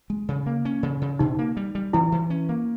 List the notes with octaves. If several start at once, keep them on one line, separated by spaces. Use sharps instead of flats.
G#3
C#3
A#3
C#4
C#3
C#3
B2 D#4
A#3
G3
G3
E3 E4
E3
C#4
A#3